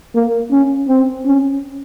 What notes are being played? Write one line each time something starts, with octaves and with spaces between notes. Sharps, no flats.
A#3
C#4
C4
C#4